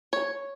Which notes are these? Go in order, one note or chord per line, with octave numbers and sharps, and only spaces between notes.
C#5